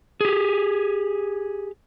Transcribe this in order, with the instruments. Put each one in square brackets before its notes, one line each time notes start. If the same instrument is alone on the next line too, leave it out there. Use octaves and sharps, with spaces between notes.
[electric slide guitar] G4 G#4